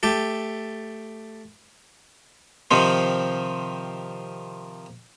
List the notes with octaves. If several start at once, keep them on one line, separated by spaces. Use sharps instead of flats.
A3 G4 A4
C3 D#3 F3 C4